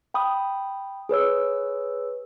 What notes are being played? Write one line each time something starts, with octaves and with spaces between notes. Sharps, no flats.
G5 B5 D#6
G#4 B4 C#5 E6